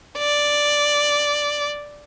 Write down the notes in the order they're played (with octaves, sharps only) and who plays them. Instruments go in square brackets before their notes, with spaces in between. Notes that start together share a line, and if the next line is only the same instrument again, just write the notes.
[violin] D5